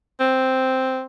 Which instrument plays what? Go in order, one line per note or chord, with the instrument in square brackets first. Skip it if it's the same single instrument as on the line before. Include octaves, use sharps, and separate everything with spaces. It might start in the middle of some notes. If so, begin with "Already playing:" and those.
[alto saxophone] C4